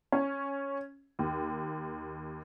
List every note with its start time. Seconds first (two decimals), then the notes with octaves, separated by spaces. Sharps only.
0.12 C#4
1.19 D#2